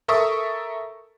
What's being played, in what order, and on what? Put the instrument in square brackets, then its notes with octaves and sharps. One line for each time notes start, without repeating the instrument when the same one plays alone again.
[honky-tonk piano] A4 A#4 E5 C#6 D#6